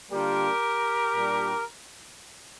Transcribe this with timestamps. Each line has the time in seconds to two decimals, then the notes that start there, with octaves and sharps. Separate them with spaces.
0.11 D3 G3 A#3 D4 F4 G4 A#4
1.15 A#2 G3 D4